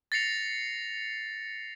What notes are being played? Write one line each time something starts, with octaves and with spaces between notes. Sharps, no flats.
A6 A#6 C7 C#7 F7